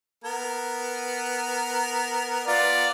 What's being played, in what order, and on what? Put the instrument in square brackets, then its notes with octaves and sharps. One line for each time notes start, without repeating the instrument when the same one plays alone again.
[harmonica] B3 A#4
[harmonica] B3 F4 [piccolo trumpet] D5